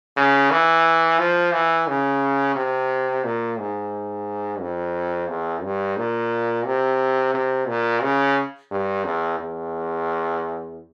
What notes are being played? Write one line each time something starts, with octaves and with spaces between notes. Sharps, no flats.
C#3
E3
F3
E3
C#3
C3
A#2
G#2
F2
E2
G2
A#2
C3
C3
A#2
C#3
G2
E2
E2